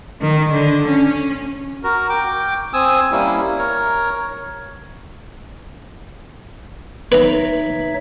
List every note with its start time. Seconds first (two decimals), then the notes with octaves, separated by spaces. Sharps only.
0.21 D#3
0.52 D3
0.88 C#4
1.83 F#4 A#4
2.09 G5 D6
2.73 C4 G#5 D#6 E6
3.12 G3 A#3 C#4 E4
3.58 A#4 C#5
7.12 D#4 B4 C#5 E5 A#5